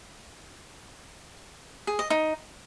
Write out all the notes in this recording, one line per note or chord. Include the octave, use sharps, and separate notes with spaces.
G#4
D#5
D#4